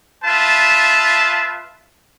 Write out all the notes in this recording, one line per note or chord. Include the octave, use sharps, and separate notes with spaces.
F4 B4 E5 A5